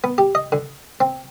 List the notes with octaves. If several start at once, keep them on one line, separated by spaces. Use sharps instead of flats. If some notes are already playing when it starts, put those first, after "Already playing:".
B3
G4
D#5
D3
C4